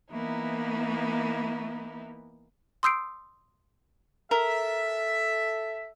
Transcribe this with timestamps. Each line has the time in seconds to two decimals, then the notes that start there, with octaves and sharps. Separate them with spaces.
0.12 E3 A#3 B3 D#4 E4
2.83 C6 D#6 E6 G6 C7 D7
4.31 A4 A#4 E5